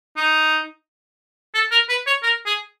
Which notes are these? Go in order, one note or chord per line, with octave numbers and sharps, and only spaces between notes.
D#4
A4
A#4
B4
C#5
A#4
G#4